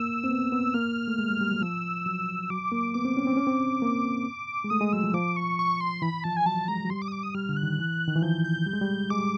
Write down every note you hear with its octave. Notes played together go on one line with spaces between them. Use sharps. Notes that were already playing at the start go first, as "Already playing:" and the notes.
Already playing: A#3 E6
C4
B3
B3
A#3 F6
A3
G#3
G3
G3
F#3
F3 E6
F#3
F#3 D6
A#3
B3 D6
C4
C#4
C4
C#4
C4
A#3
G#3
A3 D#6
G#3
F#3 E6
F3
F3 D6
C#6
C#6
C6
E3 B5
F3 A5
G#5
F#3 A5
G#3 A#5
F#3
G3 C6
D6
D#6
D6
D#6
G3 F6
D3
F#6
D#3
E3
D#3
E3
F3 G6
G6
G3
G#3
G3
G#3 D6
G3